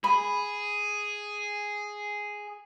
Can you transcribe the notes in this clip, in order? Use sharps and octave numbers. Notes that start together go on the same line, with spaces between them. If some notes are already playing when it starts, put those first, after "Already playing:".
G#4 B5